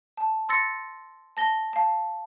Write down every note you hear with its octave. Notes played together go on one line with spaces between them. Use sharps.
A5
C6 E6 A6 A#6 C#7
A5 A#6 G7
F5 A5